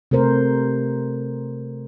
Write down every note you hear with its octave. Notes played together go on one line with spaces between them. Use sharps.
C3 A3 A#4 C5